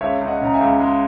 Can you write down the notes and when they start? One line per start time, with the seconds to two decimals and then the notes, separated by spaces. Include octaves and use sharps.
0.01 C#2 C#5 E5
0.21 C#2
0.27 D#5 F#5
0.41 C#3 A#5
0.54 E5 G#5
0.61 C#2
0.80 G#3